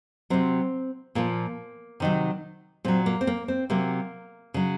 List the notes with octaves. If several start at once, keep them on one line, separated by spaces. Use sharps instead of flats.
C3 F#3 C4
A#2 F3 A#3
C3 D#3 F#3
A#2 F#3 C4
A#3
C4
A#3
C4
C3 F#3 A#3
C#3 F#3